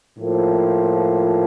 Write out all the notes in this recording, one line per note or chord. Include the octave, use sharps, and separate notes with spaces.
A2 F3 A#3